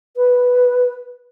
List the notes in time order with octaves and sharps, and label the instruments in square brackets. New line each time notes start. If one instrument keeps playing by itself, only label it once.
[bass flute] B4